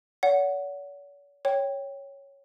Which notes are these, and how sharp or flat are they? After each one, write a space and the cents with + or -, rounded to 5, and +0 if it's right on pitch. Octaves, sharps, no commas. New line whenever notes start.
C#5 +45 F#5 +0
C#5 +0 G5 +0